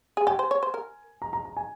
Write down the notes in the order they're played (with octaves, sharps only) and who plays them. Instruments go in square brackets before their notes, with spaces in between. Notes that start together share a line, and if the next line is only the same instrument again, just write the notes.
[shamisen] G#4
[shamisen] G4 [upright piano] G#5
[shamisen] C5
C#5
C5
A#4
[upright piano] A#5
A#5
A#5
G#5